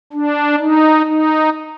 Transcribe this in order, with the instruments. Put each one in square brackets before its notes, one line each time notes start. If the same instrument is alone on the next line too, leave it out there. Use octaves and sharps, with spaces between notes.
[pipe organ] D4
D#4
D#4